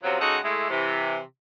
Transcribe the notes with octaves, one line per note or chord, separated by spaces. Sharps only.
F#2 C3 F3 F#3
C#3 G#3 D#4 F#4 A4 F#5
G#3 A3 E4
C3 E3